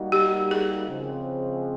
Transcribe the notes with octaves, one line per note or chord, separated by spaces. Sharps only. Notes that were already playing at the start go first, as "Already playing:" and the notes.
Already playing: G3 A#3 D#4 F#4
G4
G#4
C#3 F3 G#3 C4